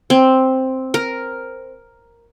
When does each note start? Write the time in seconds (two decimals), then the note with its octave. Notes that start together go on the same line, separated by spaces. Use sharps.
0.10 C4
0.94 A#4